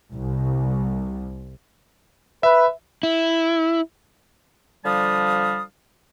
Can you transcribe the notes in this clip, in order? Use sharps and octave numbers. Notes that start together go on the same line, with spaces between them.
C2
B4 E5
E4
D3 F3 G3 F5 A5 D#6